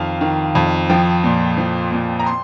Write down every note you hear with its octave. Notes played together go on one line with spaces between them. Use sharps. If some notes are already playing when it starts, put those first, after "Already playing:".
Already playing: F2 D#3 F5
D#3
F2
F3 G5
A#2
F3
A#2
A#5
C6